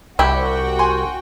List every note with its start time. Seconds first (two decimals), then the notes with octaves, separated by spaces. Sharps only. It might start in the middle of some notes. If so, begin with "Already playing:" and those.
0.19 C2 E4 F#4 G4 G5
0.79 G#5 C6 C#6